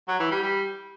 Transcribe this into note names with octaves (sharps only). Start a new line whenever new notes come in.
F#3
E3
G3
G3